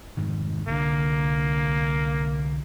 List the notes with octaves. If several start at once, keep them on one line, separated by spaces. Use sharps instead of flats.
F1 G#2 D#3
C2 D3 A#3 D4